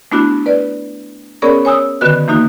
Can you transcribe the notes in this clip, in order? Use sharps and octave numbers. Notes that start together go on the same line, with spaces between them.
A3 B3 D4 E4 F#4
B4 D5
B3 C#4 G#4 A#4 C#5 D5
C#5 G#5 D#6 E6
D3 D#3 B3 F#4 B4 F#6
E3 A#3 D#4 F#4